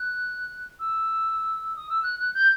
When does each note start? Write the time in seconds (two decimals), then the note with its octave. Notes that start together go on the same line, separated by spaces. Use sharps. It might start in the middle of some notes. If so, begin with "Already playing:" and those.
Already playing: F#6
0.79 E6
1.76 D#6
1.89 E6
2.03 F#6
2.19 F#6
2.34 G6